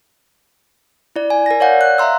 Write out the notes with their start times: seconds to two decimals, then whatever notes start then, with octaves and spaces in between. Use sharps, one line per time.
1.16 E4 D5
1.30 G#5
1.46 A#4 A#6
1.60 C#5 D5 F5 F#5 G6
1.81 F#6
1.98 E5 F5 A#5 C6 E6